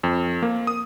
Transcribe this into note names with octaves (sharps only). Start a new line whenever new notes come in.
F2
A#3
D#6